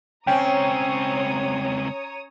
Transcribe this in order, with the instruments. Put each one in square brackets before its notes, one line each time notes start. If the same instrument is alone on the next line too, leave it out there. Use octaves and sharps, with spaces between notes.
[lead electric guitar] C#2 C4 [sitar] C#4 [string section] C#5 A#5 D#6 [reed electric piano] G5